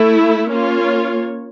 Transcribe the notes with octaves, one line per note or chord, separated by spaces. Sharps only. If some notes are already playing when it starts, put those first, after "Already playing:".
Already playing: A3 E4 A4
A#3 C#4 F4 C#5